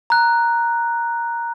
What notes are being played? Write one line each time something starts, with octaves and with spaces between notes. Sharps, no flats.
A#5 F#6